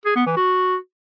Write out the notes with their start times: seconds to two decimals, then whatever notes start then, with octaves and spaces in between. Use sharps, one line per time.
0.06 G#4
0.16 B3
0.26 E3
0.37 F#4